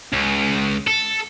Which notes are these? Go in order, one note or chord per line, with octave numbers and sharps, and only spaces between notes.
C#2
A4